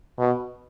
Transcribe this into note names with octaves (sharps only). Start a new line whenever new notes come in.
B2